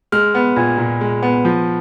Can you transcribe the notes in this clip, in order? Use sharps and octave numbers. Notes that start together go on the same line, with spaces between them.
G#3 F6
B3
A#2
A#2
G#3
B3
F3